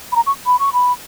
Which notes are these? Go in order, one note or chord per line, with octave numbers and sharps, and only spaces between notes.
B5
A#5
C#6
B5
C#6
B5